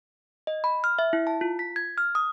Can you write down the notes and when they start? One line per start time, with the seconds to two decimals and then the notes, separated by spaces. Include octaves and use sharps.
0.47 D#5
0.64 B5
0.84 F6
0.99 E5
1.13 E4
1.27 A5
1.41 F4
1.59 B6
1.76 G#6
1.98 F6
2.15 D#6